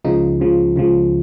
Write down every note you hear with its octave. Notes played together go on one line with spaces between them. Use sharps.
C#2 C#3 F3 D#4
C#2 C#3 F3
C#2 C#3 F3